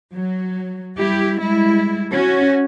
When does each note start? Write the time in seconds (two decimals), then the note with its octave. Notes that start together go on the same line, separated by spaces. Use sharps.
0.13 F#3
0.98 G3 E4 G4
1.41 G3 G#3 E4
2.12 C#4 F#4